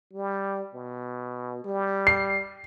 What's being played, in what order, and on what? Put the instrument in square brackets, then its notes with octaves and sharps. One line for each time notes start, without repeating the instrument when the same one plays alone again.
[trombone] G3
B2
G3
[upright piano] C7